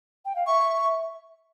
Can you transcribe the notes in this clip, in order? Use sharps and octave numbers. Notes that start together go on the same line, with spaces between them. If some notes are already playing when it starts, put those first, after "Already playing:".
G5
F5
E5 C#6